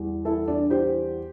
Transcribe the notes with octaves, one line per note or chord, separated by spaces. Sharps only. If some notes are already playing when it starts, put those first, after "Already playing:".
Already playing: E2 G3
E4 A4
D4
G4 C5